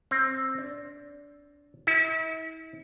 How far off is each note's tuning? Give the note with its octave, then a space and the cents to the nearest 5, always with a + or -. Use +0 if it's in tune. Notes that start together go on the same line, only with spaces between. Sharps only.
C4 +15
D4 -20
E4 -40